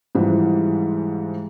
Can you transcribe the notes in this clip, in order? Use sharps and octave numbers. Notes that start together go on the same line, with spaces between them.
G#2 E3 F3 G3